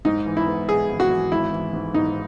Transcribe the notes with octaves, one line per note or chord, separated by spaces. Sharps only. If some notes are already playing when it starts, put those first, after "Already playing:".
G#2 D#4
E3
E4
B3
B3 G#4
G#1
F#4
E3
G#1 E4
E3
G#2
G#2 D#4